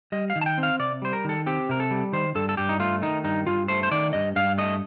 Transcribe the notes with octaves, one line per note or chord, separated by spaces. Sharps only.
G3 D#5
F5
D#3
A5
G5
C4
F5
C3 D5
G3 C5
A#4
D#3 A4
C4 G4
C3 A#4
A4
G3
D#3 C5
G2 A4
A4
G2 G4
D#4
A3 F4
D#3 D#4
G2 D#4
G2 F4
A3 C5
C5
D#3 D5
G2 D#5
G2 F5
A3 D#5